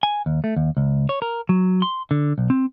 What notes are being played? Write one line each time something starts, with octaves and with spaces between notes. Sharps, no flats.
G#5
D#2
A3
D#2
C#2
C#5
A#4
F#3
C6
D3
B1
C4